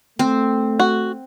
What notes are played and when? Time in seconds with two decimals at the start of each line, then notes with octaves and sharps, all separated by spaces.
0.19 A3 C4
0.79 F#4